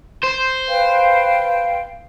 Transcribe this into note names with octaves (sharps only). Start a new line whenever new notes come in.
C5
B4 F5 G5